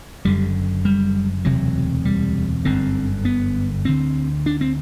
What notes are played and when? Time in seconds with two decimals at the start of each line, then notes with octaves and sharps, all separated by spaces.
0.25 F#1 F#2 D3 G3
0.85 G3
1.45 E1 D2 C3 F#3
2.05 G3
2.65 G1 F#2 D3 C4
3.25 B3
3.85 D2 D3 C4
4.46 D4
4.61 C4